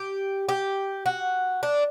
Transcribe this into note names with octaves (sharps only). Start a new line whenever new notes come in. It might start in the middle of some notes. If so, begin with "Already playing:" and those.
Already playing: G4
G4
F#4
D4